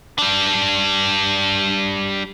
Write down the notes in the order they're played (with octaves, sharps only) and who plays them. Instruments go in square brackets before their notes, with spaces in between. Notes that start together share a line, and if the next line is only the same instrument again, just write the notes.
[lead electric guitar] G3 D4